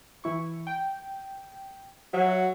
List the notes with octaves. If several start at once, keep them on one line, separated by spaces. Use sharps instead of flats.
E3 E4 C#6
G5
F#3 F#4 E5